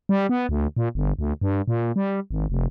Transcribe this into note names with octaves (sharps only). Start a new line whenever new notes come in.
G3
B3
D2
A#2
G1
D2
G2
A#2
G3
G#1
F1